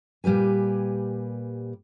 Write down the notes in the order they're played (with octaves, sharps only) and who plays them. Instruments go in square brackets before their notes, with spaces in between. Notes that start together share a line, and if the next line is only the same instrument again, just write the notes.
[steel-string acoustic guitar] A#2 G3 G4 B4 G#5